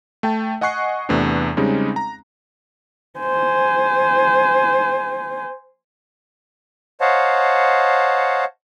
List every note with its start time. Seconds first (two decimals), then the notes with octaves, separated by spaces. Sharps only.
0.23 A3 G5 A5
0.61 D#5 F#5 G#5 C#6 F#6 C7
1.09 E2 C3 A3 B3 D4
1.57 C#3 G3 G#3 C4 C#4 D#4
1.96 A#5
3.20 C5 G#5
7.01 C5 C#5 D#5 F5 F#5 A5